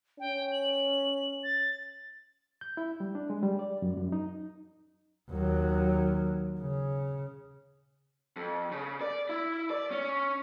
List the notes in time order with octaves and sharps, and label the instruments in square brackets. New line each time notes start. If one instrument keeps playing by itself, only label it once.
[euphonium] C#4 [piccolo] G5
[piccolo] F#7
A6
[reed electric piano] G6
E4
G3
D4
G#3
G3
D5
F#2
F#2
D#4
[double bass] D#2 F#3
C#3
[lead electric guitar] F2
C#3
D5
E4
D5
C#4